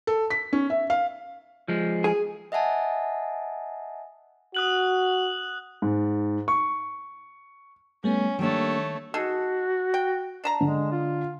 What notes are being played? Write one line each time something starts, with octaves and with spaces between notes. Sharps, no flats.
A4
B6
C#4
E5
F5
F3 G#3
G#4
D#5 E5 F#5 G#5 A5
F#4 D#6 F#6 F#7
G#2
C#6
G3 A3 B3 C#4
D#3 G3 A3 A#3 D4 C#5
D#4 F#4 G#4 A4
G5
D4 A5 A#5
D3 G#3
F4